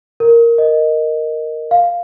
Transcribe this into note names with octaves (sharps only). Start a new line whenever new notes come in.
A#4
D#5
F5